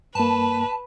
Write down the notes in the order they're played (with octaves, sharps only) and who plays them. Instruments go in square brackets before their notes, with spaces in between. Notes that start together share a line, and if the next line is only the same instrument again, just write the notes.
[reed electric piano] G2 A#3 [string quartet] B4 [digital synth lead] A5